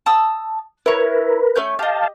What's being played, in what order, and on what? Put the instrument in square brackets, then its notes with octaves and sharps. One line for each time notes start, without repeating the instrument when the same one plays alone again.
[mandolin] A5 D#6 E6
[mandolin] E4 C#5 [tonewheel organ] A#4 B4
[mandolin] A3 C#4 G6
[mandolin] G4 D#5 [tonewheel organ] F5 A5